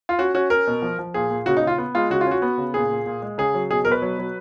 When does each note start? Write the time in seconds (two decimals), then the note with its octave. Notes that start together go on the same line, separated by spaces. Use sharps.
0.09 F4
0.18 C#4 F#4
0.35 C#4 F#4
0.50 C#4 A#4
0.67 B2
0.82 F3
0.99 F3
1.14 A#2 G#4
1.31 A#2
1.46 C#3 F#4
1.57 D#4
1.62 C#3
1.67 F4
1.78 B3
1.95 G#3 F4
2.10 C#3 F#4
2.21 F4
2.26 C#4
2.31 F#4
2.42 B3
2.58 C#3
2.74 A#2 G#4
2.91 A#2
3.06 A#2
3.22 G#3
3.38 C#3 G#4
3.54 F#3
3.70 B2 G#4
3.85 B2 A#4
3.92 B4
4.02 F#3
4.19 F#3